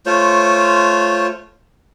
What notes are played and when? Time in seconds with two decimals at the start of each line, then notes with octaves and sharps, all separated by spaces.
0.06 A3 F4 C5 C#5